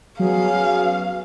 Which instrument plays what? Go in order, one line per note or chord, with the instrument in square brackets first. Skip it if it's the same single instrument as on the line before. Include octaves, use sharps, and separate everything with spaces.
[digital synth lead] F#3 [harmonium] B3 C#4 G#4 [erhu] F5